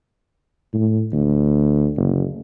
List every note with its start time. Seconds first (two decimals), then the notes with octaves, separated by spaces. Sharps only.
0.73 A2
1.13 D2
1.96 F#1